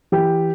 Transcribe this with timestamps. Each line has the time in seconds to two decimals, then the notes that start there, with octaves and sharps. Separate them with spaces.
0.12 E3 G4